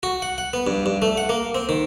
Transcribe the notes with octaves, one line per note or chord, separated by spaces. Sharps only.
F#4
F#5
F#5
B3
G2
G2
A3
F#5
A#3
C4
D#3